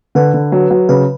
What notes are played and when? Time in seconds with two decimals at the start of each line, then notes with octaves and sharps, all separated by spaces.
0.15 D3 B4
0.34 D3
0.52 F#3
0.71 F#3
0.89 C#3 B4